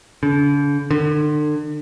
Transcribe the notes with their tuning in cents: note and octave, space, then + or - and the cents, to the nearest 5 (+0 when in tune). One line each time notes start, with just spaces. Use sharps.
D3 -45
D3 +35